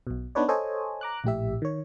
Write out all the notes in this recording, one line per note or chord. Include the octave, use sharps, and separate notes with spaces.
B1 B2
B3 D4 D#4 B4 C#5 D5
A4 C5 C#5 D#5 G#5
A#5 D6 F#6
A#1 A2 G4 E5
D#3 C#5